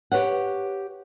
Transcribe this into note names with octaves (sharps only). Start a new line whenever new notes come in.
G4 B4 C#5 F#5